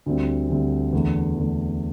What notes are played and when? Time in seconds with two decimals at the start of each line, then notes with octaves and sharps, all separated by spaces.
0.06 D2 D3 G3 C4
0.49 D2 D3 G3 C4
0.93 E2 D3 A3
1.37 E2 D3 A3